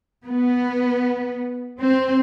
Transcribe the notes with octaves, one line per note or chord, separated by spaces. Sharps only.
B3
C4